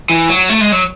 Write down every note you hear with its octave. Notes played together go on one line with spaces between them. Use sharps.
E3
F#3
A3
G#3
F#3